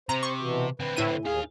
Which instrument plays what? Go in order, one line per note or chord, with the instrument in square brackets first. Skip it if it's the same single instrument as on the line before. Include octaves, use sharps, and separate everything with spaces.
[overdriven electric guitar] C3 [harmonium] C5 [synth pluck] A#5
[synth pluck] C#6
[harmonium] B2 E3 F#4
[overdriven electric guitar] D3 C4 [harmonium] B4
[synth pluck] A2 E4 D#7
[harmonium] D#2 G#4 G#5 [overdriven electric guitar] D#4 F5